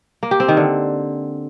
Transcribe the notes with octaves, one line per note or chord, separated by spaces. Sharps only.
A#3
G4
C4
D#3
D3